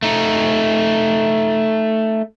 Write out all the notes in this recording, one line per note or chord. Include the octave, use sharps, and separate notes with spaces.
A3 D#4